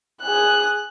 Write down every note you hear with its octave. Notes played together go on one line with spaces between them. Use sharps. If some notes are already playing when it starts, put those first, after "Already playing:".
G#4 F#6